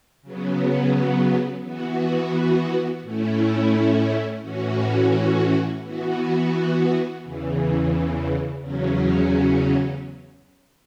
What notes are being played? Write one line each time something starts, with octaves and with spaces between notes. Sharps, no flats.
C#3 F#3 B3
E3 B3 F#4
A2 A3 C#4 E4
A2 E3 C#4 F#4
E3 B3 F#4
E2 C#3 E3
E2 C#3 F#3 C#4